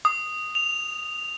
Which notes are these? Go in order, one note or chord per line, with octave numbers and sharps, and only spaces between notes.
D#6
F7